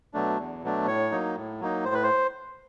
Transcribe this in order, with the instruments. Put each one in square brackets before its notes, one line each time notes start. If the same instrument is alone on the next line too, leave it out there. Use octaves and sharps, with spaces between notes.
[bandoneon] B2 F#3 A3 D4
E2
B2 F#3 A3 D4
A2 C#5
F#3 A#3 D#4
A2
F#3 A#3 D#4
A2 C5
B4
C5